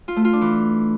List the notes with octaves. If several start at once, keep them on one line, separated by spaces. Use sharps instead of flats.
F4
A3
F4
D4
E3